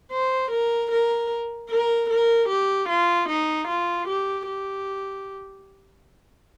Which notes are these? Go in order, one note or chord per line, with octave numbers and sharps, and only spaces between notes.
C5
A#4
A#4
A#4
A#4
G4
F4
D#4
F4
G4
G4